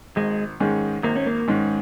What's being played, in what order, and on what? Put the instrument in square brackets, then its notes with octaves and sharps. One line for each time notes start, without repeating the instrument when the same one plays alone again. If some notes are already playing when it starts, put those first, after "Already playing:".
[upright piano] G#1 [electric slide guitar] G#3
[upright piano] G#2 D#3 G#3 C#4
[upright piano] G#1 [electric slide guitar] A#3
[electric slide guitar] C#4
A#3
[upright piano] G#2 D#3 G#3 C#4